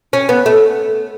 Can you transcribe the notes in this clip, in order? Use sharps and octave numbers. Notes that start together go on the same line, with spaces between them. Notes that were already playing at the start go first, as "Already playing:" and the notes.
C#4
B3
A3